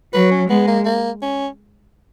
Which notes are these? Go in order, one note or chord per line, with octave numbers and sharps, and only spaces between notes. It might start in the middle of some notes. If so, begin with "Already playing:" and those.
F#3 B4
C#4
G#3 B3
A#3
A#3
C#4